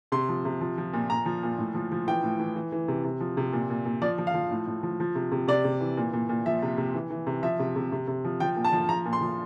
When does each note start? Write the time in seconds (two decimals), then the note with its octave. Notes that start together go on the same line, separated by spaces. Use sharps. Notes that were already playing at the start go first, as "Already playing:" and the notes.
0.12 C3 C6
0.29 F3
0.45 C3
0.61 F3
0.78 F3
0.93 A#2
1.10 A#2 A#5
1.26 F3
1.43 A#2
1.58 A2
1.75 F3
1.92 F3
2.07 E3 G5
2.23 A2
2.39 E3
2.56 E3
2.72 E3
2.88 C3
3.04 C3
3.20 F3
3.37 C3
3.53 A#2
3.70 A#2
3.85 A#2
4.02 F3 D5
4.18 F3
4.27 F5
4.34 F3
4.51 A2
4.67 A2
4.83 F3
5.00 F3
5.15 C3
5.32 C3
5.48 C3 D5
5.64 C3
5.80 E3
5.97 A#2
6.13 A#2
6.29 A#2
6.46 F3 E5
6.62 C3
6.78 C3
6.94 E3
7.10 E3
7.27 C3
7.42 F3 E5
7.59 C3
7.76 C3
7.92 C3
8.07 C3
8.25 F3
8.40 F3 G5
8.56 A#2
8.64 A5
8.73 F3
8.89 F3 A#5
9.05 A#2
9.13 C6
9.21 F3